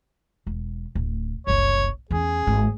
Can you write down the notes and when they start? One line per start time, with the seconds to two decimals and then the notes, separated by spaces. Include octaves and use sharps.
0.47 E1
0.95 D1
1.47 F#1 C2 C#5
2.11 E2 C#4 G#4
2.47 G#1 B3